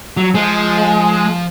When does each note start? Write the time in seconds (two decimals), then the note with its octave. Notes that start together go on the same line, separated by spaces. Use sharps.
0.17 F#3
0.34 F3 G#3